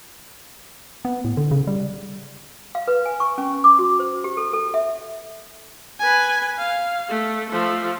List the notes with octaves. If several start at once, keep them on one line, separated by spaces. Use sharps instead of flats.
B3
A2
D3
C#3
G3
F5
B4
G#5
C#6
C#4
D6
F#4
C5
G4
A4
A4
E5
B4 G#5
F5
A3
F3 A3